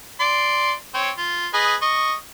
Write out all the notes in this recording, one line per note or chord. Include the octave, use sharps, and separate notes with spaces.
D5 C6
C4 C#5
F4
G#4 B4 D#5
D#5 C#6